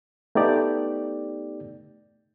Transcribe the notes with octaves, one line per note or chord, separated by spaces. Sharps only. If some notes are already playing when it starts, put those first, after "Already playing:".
A3 B3 D#4 G4 D5